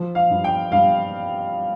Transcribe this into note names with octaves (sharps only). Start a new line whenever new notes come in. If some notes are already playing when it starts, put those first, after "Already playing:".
Already playing: F3
F5
G2
G5
G2 F5